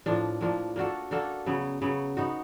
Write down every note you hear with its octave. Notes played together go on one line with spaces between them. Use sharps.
A2 F3 A#3 D4
A2 F3 A#3 D4
A#3 D4 F#4 A4
A#3 D4 F#4 A4
C#3 F#3 B3
C#3 F#3 B3
B3 D#4 F#4